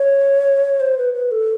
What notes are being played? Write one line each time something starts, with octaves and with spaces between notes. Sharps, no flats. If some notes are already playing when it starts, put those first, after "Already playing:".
Already playing: C#5
C5
B4
B4
A4